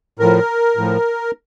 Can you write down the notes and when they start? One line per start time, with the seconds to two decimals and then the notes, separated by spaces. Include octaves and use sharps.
0.19 A2 F3 A#4
0.77 A2 F3